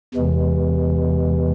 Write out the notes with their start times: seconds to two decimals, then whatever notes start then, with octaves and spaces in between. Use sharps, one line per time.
0.14 E2 C3 E3 G#3